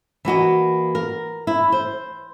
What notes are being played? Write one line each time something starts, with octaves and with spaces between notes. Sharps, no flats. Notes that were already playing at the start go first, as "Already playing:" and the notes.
E3 A#3 F#4 D#5
A#4
E4
C5